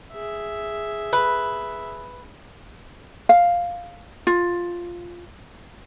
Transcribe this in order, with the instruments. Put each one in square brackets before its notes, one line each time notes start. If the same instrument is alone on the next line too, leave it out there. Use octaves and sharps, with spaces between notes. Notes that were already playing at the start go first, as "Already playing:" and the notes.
[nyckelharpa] G#4 E5
[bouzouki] B4
[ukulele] F5
F4